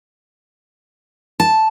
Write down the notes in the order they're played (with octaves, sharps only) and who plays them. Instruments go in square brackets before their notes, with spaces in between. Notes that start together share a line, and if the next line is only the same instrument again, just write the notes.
[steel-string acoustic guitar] A5